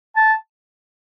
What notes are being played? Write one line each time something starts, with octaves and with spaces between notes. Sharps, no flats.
A5